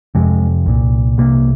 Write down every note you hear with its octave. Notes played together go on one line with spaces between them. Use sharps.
F2 C3 G#3
C2 A#2
C2 C3 A#3